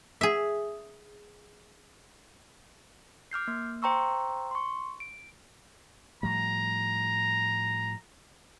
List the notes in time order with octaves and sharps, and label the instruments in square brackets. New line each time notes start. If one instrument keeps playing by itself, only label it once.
[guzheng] G#4 E5
[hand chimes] D6 F6 G6 C7
A#3
C5 G5 A#5 C6 C#6 E6
C6 C#6
D7
[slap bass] A2 F3 G3 [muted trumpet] A#5